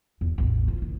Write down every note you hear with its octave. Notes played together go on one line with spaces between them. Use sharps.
E2
A1 E2
D2 F4
F#1